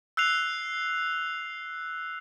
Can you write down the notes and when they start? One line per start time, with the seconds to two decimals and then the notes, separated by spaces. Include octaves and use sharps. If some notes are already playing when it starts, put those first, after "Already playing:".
0.17 E6 F#6 C7 F7